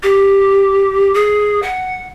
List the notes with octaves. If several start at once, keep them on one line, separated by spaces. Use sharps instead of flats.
G4
G#4
F#5